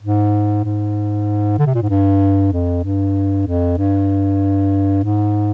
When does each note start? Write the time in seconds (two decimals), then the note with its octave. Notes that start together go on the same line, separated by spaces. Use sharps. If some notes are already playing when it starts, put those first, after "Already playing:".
0.02 G#2
0.65 G#2
1.59 D3
1.67 C3
1.75 A#2
1.82 G#2
1.90 G2
2.53 F2
2.85 G2
3.47 F2
3.78 G2
5.04 G#2